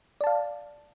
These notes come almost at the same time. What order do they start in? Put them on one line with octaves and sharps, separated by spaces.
D5 A5 F5